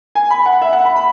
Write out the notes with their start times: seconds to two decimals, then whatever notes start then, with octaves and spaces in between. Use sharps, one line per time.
0.15 G#5
0.30 B5
0.46 F#5
0.61 E5
0.73 F#5
0.85 B5
0.96 B5